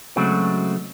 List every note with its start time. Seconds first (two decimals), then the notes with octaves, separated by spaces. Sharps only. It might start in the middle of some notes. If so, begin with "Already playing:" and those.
0.16 C#3 F#3 G#3 A3 C4 F#4